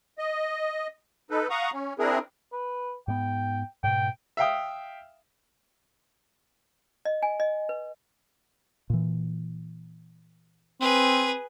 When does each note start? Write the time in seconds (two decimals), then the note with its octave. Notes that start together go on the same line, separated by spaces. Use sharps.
0.18 D#5
1.30 D#4 A4 B4
1.50 F5 F#5 A#5 C#6 D#6
1.73 C#4
1.99 C4 D4 E4 G#4 A#4
2.52 B4
3.08 G#2 B3 G5
3.83 G#2 B2 G5
4.37 E5 F5 G5 D#6
7.05 D#5
7.22 G#5
7.40 D#5
7.69 B4
8.90 A#2 E3
10.81 C4 G#4 B4